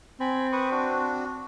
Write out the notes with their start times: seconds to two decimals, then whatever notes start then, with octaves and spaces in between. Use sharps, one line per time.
0.20 C4 G#5 B5
0.52 B4 C#6 D#6
0.71 D4 F#4